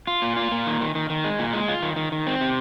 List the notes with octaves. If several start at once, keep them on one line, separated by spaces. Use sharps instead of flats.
F4
A#2
F4
A#2
D#3
D#3
D#3
D#3
G#3
A#2
G#3
F4
D#3
D#3
D#3
C4
C3